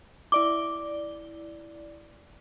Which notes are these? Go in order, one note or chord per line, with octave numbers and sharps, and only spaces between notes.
E4 D5 D6 G7